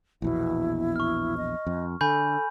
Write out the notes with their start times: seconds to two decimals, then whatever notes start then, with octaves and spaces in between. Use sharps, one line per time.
0.22 A#1 E2 B2 E4
0.96 C#6 F6
1.37 D#5
1.67 F2
2.01 D3 A4 G#5 B5 G6